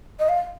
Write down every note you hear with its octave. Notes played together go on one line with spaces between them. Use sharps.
D#5
F5